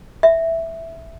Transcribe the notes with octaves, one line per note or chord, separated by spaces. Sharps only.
E5